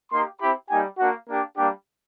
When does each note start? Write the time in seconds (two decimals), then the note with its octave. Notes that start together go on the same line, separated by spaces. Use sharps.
0.11 A#3 D#4 G4 C6
0.41 C4 E4 G4 B5
0.70 G3 A#3 D#4 G4 G#5
0.99 A#3 D4 F#4
1.28 A#3 D4 G4
1.57 G3 A#3 D4 G4